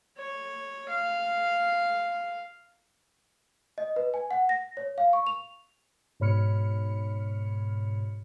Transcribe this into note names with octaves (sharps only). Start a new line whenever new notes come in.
C#5
F5
D#5
B4
G#5
F#5
A#6
C#5
F5
C#6
F7
G#2 B2 C#5 B5 F6 C#7